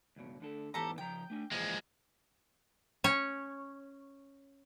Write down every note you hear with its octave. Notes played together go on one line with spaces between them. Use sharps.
C#2 G2 B2
D2 D3 A4
G#2 E3 B3 G4 A4 A#5
C#3 F3 G5 A#5
A3 D4 G#5
A#2 E3 F3 G#3 F5
C#4 C#5